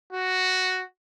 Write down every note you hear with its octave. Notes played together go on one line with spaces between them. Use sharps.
F#4